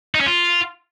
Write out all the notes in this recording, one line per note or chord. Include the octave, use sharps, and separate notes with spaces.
D#4
C#4
F4